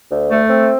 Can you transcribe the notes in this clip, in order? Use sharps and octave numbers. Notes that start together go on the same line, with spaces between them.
D2
A3
C4